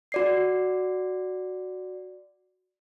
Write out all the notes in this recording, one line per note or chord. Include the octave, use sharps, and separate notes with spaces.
F#4 D5 C7